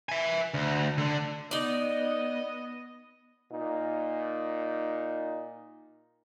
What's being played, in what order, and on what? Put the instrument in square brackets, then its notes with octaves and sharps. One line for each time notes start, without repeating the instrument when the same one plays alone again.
[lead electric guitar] E5 G#5
D2
D3
[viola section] B3 [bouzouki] D#4 D5 [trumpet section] D#5
[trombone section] A#2 D#4